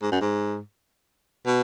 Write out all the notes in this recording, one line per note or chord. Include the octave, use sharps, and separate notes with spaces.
G#2
F#2
G#2
B2